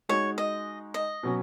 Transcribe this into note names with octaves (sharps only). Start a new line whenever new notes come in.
G#3 D#4 F#4 C#5
D#5
D#5
B2 F#3 C#4